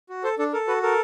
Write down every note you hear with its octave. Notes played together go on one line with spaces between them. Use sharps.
F#4
A4 C5
D4 A4
A4 A#4
F#4 B4
A4 A#4